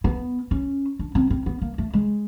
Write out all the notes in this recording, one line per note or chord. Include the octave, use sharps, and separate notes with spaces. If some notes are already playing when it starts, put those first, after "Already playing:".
B3
C#4
D4
C4
C4
B3
A#3
A3
G#3